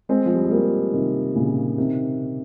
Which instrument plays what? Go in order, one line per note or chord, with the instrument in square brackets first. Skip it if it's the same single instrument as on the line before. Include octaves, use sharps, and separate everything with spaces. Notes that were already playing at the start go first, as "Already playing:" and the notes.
[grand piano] G#3 C4
F3
G3
G#3
G3 A#3
C3 D#3
A#2 C#3
C3 D#3